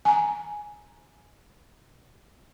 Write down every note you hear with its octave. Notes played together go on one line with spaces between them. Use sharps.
G#5 A#5